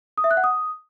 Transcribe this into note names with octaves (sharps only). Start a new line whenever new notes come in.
D#6
E5
F#6
F#5
D#6